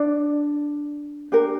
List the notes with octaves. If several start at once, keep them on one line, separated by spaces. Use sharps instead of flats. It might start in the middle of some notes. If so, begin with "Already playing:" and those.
Already playing: D4 D5
D4 G4 A#4